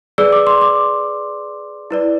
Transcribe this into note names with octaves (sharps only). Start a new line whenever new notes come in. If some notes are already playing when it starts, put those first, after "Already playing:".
G#4 B4 D5 E6
D6
C6
D6
E4 B4 D5